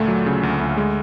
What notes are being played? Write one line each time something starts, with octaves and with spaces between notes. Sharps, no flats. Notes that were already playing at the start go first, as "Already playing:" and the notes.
Already playing: D2 A#2 A3
F#3
C#3
D2
D2
G#3